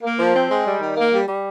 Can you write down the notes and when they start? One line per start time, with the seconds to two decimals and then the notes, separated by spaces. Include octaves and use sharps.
0.03 A#3
0.18 F3
0.34 C4
0.50 G#3
0.65 G3
0.80 D#3
0.97 A#3
1.12 G3
1.27 G3